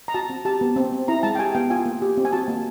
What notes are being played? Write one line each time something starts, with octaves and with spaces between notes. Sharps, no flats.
A#5
F#4 A5
C4
G4 A5
B3
C4
C4
E4 A#5
G#3 A5
G5
G4 G#5
B3 G5
F4 G#5
A#3
G4
C4
G#5
F#4 A5
A#3